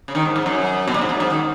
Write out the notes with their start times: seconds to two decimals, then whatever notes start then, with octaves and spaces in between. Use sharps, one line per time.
0.08 C#3
0.15 D#3
0.25 G#2
0.36 G#2
0.46 F#2
0.87 B2
0.94 A#2
1.01 G#2
1.09 F#2
1.20 G#2
1.30 D#3